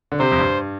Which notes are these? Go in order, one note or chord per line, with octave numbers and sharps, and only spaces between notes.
D3
C3 C5
F2
G2